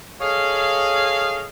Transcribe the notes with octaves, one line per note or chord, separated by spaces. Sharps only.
G#4 A4 C#5 D#5 F5